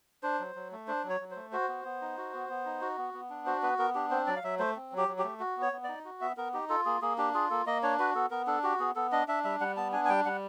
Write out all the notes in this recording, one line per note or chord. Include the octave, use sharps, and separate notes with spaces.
D4 C5
F#3
F#3
A3
D4 C5
F#3
C#5
F#3
C5
A3
F#4 C5
B3
B3
D#4
F#4
B3
B3
D#4
F#4
B3
B3
D4
F#4 C5
B3 B4
B3 A#4
D4 G4
C4 C5
F#3 D5
F5
F#3 E5
A3 C5
C4
F#3
G4
F#3
G4
A3
F#4
B3
C#5
B3
D#4 D5
F#4
B3 E5
B3 A#4
D#4 G4
F4 A4
A#3 G#4
A#3 G#4
D4 G4
F4 G#4
A#3 A4
A#3 D#5
D4 C#5
F#4 B4
B3 A4
B3 A#4
D4 A4
F#4 G4
B3 G#4
B3 A4
D4 D#5
D4 E5
G3 E5
G3 F#5
B3 A5
D4 G#5
G#5
G3 G5
G3 F#5